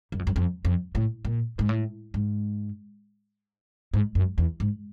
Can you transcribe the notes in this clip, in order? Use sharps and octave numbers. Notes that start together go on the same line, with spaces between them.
F#2
F2
F#2
F2
F2
A2
A#2
G#2
A2
G#2
G#2
F#2
E2
G#2